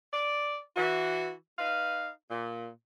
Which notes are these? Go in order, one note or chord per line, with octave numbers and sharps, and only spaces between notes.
D5
E3 F#4
D#4 B4 F5
A#2